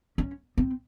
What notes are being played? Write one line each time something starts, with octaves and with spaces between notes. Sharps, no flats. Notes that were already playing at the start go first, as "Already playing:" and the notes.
C#4
C4